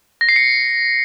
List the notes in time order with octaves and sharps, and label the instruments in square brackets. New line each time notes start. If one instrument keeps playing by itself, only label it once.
[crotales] A#6
C7
C#7